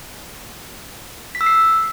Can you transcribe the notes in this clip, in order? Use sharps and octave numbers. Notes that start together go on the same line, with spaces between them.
B6
E6
C7